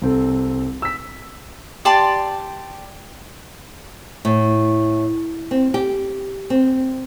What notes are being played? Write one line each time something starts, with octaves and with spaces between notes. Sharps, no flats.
C2 C4 A4
E6 B6
G4 D5 A5 C6
A2
C4
G4
C4